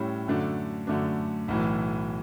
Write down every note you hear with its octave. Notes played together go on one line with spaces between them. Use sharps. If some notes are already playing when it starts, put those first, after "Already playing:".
Already playing: A2 G3 C#4 E4
F#2 D3 A3 D4
F#2 D3 A3 D4
B1 A2 E3